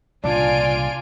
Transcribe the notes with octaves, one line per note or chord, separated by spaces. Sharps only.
C2 A#2 C#3 D4 F4 D5 G#5 D7